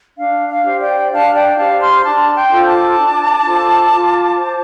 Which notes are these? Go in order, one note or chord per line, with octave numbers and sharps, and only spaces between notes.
D4 F5
F5
G4 C5
D5 G5
D4 F5 A5
D5 G5
G4 C5 F5 A5
C6 F6
D4 A5 D6
G5 C6
F4 A4 C5
A5 D6
D4
F4 A4 C5
F4
C5